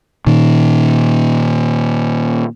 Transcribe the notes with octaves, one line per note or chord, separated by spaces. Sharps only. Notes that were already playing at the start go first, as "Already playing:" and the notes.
A#2 D#3